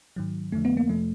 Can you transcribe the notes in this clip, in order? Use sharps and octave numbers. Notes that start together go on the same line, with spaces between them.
G#2 D#3 F#3
F2 D3 F3 A3
B3
A#3
F2 C3 F3 A3